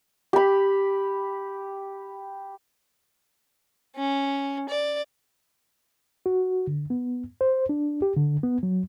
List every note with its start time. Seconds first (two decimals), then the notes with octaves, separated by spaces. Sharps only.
0.33 G4 B5
3.96 C#4
4.69 D5
6.26 F#4
6.67 D3
6.90 B3
7.41 C5
7.69 D4
8.02 G4
8.17 D3
8.43 B3
8.63 F#3